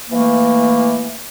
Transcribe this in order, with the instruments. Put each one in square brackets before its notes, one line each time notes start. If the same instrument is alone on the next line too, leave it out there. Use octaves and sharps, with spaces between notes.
[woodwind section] E3 A3 A#3